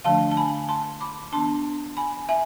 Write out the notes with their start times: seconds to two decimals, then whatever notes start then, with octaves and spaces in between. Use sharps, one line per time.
0.04 D3 F3 A3 D4 F5 A5
0.31 A5
0.37 G#5 B5
0.69 A5 C6
1.01 B5 D6
1.32 E3 B3 D4 A5 C6
1.97 G#5 B5
2.29 E5 G#5